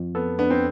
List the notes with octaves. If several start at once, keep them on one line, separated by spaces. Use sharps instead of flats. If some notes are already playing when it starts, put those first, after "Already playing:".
Already playing: F2
B3 A4
B3 D4
C4